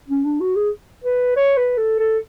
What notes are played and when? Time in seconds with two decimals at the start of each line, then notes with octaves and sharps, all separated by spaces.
0.08 C#4
0.25 D4
0.40 F#4
0.56 G#4
1.04 B4
1.36 C#5
1.57 B4
1.77 A4
1.99 A4